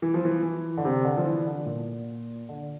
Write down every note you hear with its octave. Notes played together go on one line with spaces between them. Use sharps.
E3
F3
E3
E3
D3
C3
D3
F3
E3
D3
A#2
D3